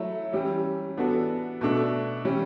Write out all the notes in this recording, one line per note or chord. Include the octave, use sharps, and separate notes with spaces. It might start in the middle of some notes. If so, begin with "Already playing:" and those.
Already playing: F#3 A3 E4
E3 G3 C#4 G4
E3 B3 D4 F#4 A4
B2 A3 D4
E3 G3 C#4